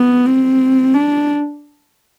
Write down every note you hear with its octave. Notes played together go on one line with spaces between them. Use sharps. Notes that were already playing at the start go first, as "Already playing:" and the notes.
Already playing: B3
C4
D4